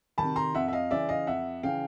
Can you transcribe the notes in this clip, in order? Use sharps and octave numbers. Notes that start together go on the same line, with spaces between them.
C3 D#3 A5 B5
A#5 C6
F2 E5 F#5
E5
D#5 F5
C#3 E3 D5 E5
D#5 F5
F2 E5 F#5
C#3 E3 F5 G5